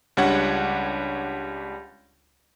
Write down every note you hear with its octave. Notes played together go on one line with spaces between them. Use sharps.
C#2 G3 D4 C#5 F#5 G#6